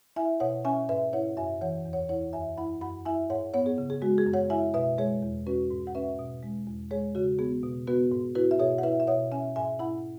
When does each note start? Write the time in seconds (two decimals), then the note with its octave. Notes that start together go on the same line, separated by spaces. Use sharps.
0.16 E4 E5 G#5
0.40 B2 C#5 F#5
0.65 C#4 E5 G#5
0.89 G#2 B4 E5
1.13 E4 C#5 F#5
1.37 F#2 E5 G#5
1.61 E3 C#5 F#5
1.85 E2
1.93 C#5 F#5
2.09 E4 C#5 F#5
2.33 F#2 E5 G#5
2.57 E4 F#5 B5
2.81 F#2 F#5 B5
3.05 E4 E5 G#5
3.30 G#2 C#5 F#5
3.54 B3 C#5 F#5
3.66 G#4
3.78 C#3
3.90 G#4
4.02 G#3 F#4
4.18 G#4
4.26 F#2
4.33 C#5 F#5
4.50 E4 E5 G#5
4.74 B2 B4 E5
4.98 G#3 G#4 C#5
5.23 E2
5.47 C#4 F#4 B4
5.71 G#2
5.87 F#5
5.95 C#4 B4 E5
6.19 B2
6.43 G#3
6.67 E2
6.91 G#3 G#4 C#5
7.15 C#3 F#4
7.39 B3 G#4
7.63 B2
7.87 B3 F#4 B4
8.12 G#2
8.35 E4 F#4 B4
8.51 E5
8.59 B2 G#4 C#5
8.78 F#5
8.83 E4 B4 E5
9.00 E5
9.07 B2 C#5 F#5
9.32 C#4 E5 G#5
9.56 G#2 E5 G#5
9.79 E4 F#5 B5